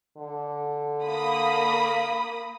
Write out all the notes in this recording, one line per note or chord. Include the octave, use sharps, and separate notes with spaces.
D3
A#3 B5 D#6